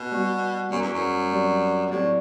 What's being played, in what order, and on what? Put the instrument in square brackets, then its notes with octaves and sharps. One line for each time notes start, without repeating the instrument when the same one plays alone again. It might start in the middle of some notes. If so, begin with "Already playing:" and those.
Already playing: [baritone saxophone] B2 [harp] E4
[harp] G3 B3 F#4
[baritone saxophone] F#2 [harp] G3 B3 F#4
[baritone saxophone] E2
F#2
[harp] F#3 C4 G4 D5
[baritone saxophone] B2
[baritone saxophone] A2 [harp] F#3 C4 G4 D5